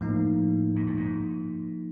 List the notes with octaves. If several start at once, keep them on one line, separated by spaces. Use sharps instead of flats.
A2 F3 A#3 D#4
G#2
G2
G#2